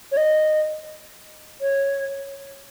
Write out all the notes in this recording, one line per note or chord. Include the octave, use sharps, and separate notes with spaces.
C#5
D#5
C#5